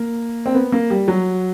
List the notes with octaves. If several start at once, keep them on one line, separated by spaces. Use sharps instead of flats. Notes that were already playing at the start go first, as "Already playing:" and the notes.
Already playing: A#3
C4
B3
A#3
G3
F#3